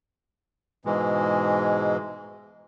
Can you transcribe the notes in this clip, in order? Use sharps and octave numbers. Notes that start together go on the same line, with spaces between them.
G#2 B2 E3 G#3